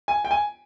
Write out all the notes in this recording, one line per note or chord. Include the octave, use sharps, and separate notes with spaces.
G#5
G5
G#5